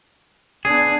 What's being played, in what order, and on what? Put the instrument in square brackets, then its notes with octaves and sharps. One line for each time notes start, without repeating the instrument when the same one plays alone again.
[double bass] B3 D4 [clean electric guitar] G#4